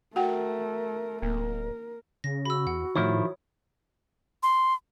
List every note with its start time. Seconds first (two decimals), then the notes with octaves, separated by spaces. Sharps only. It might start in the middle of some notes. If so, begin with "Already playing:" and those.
0.16 A3 F#4 A#4 F#5 G5
1.22 D1 A#3 A#4
2.24 C#3 A#6
2.45 F#4 B5 E6
2.67 E2 F#5
2.96 A2 D#3 F3 E4 C#5
4.43 C6